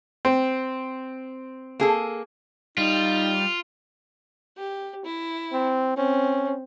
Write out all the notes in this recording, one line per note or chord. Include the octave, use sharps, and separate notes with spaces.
C4
A#3 G#4 A4
G3 D#4 F4
G4
E4
C4
C4 C#4